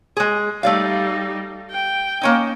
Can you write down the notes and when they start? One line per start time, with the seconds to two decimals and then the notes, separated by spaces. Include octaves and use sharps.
0.17 G#3 G#4
0.63 G3 A3 D#4 D5 F5
1.71 G5
2.21 A#3 C#4 D#4